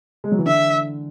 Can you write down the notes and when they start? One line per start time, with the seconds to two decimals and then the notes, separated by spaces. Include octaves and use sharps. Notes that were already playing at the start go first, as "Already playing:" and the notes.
0.24 G#3
0.32 F#3
0.38 E3
0.46 D3 E5